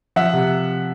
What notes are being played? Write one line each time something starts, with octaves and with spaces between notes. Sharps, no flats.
F3 E5 F#5
C3